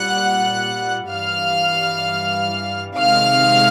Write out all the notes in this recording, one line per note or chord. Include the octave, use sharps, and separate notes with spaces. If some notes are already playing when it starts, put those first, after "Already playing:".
Already playing: A#2 G3 F#5 F#6
G2 E3 G3 F5 F6
C3 D#3 G#3 F5 F6